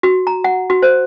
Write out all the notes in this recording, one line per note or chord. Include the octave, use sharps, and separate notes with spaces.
F#4
A#5
F#5
F#4
C5